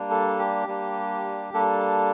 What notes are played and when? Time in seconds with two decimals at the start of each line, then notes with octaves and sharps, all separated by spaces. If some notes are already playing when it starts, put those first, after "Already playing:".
Already playing: G3 A#3 D4
0.10 A4
0.39 G4
0.67 G3 A#3 D4
1.54 G3 A#3 D4 A4